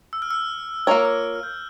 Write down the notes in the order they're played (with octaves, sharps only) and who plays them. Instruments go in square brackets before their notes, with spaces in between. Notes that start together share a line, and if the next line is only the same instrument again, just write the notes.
[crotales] E6
F6
E6
[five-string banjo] A#3 F4 A#4 C#5 [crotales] F6
[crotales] E6
F6
G6